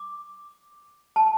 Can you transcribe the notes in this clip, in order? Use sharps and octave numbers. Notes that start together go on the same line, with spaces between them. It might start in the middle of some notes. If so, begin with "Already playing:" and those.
Already playing: D6
A5